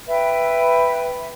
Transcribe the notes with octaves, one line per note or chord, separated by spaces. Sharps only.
B4 E5 G5